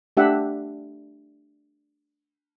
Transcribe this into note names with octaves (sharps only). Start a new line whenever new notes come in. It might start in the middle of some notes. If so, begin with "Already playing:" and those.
A3 D4 G4 E5 F#5